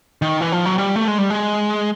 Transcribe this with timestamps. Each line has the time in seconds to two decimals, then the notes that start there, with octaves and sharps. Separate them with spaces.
0.22 D#3
0.41 E3
0.52 F3
0.65 F#3
0.78 G3
0.96 A3
1.08 G#3
1.18 G3
1.30 G#3